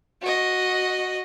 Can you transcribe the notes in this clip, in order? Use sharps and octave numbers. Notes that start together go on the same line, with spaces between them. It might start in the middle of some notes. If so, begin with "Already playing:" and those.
F#4 D#5